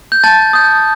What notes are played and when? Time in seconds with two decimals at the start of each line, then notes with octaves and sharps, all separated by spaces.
0.12 G6
0.24 A5 A6
0.53 D#6 G6